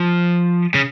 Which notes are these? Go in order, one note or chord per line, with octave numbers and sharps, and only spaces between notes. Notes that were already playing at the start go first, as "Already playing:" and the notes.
Already playing: F3
C#3